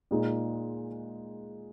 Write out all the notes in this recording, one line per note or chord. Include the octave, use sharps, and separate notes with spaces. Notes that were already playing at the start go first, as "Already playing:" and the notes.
A#2 G#3 D#4